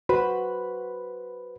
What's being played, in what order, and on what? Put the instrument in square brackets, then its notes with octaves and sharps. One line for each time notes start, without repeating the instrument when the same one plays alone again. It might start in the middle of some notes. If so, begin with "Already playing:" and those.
[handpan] F#4 [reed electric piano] B4 C5 B5